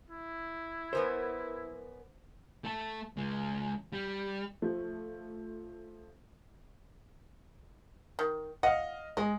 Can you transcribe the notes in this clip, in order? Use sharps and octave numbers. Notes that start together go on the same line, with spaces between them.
E4
F#2 B3 A#4 C5
A3 A4
C#2 G#3
G3
F3 A3
D#3
D#5 F5 F#5
G#3 D#5